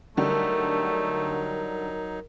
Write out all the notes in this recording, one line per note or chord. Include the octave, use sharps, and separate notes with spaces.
D3 F#3 G3 A3 D#4 A#4